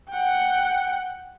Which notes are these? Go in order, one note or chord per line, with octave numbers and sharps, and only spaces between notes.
F#5 G5